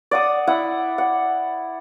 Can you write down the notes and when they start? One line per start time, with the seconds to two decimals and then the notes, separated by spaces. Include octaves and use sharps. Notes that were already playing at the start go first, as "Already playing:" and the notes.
0.11 D5 F#5 D#6
0.47 E4 F#5
0.98 F#5